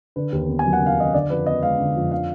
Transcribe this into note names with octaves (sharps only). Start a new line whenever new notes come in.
D3 B4
D#2
B3
G#5
F#3
F#5
D3 F5
D#2 D#5
D3 D5
F2 B4
B3 D#5
G#3 F5
D3
F2
D3 F5